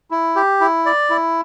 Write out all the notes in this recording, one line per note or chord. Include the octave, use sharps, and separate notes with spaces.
E4
G4
E4
D5
E4